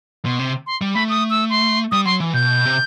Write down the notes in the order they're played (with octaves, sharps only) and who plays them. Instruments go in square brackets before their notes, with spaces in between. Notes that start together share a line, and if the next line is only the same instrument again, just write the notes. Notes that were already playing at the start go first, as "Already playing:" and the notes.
[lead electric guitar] B2 [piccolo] C6
[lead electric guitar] C3
[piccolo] C6
[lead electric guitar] G3
[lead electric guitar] A3 [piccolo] B5
[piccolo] D#6
E6
C6
[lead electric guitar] G3 [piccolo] D#6
[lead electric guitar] F#3 [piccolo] C6
[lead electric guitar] E3
[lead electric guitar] B2 [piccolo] G6
[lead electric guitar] C3